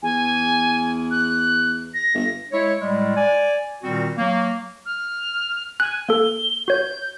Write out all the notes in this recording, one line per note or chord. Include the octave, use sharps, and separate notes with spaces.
E2 G#5
F#6
A#6
G1
G#3 E4 C#5
A2 G3 G#3
D5 G#5
A#2 D#3 G3 C4 F#4
F#3 A#3
F6
G#5 F#6
A#3 A4 G7
F#4 C#5 G6